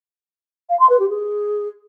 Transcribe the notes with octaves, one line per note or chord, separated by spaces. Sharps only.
F5
C6
B4
G4
G#4